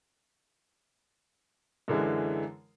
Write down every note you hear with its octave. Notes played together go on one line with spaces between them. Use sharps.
F#2 D3 E3 G#3